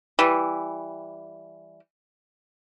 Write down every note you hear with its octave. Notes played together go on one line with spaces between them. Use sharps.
E3 G3